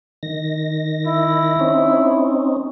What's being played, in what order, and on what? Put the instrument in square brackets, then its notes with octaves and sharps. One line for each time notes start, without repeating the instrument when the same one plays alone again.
[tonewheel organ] D#3 A#6
[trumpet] E4
[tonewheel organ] C4 C#4 D#4